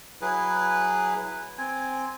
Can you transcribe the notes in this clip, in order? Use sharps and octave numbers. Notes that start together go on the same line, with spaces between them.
F#3 E4 G#4 B4
C4 G#5